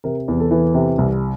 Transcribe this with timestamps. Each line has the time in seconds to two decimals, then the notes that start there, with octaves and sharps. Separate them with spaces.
0.04 C3 A#4
0.28 E2
0.40 A4
0.51 E3
0.74 C3
0.98 C2